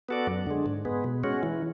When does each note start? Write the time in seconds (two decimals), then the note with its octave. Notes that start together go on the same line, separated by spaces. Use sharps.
0.09 B3 F#4 A4 D5
0.27 F#2
0.47 D3 G#3
0.66 G#2
0.85 G#3 B3
1.04 B2
1.24 G#3 C#4 F#4
1.43 E3